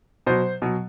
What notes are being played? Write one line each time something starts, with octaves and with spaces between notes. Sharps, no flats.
B2 F#3 C5
B2 F#3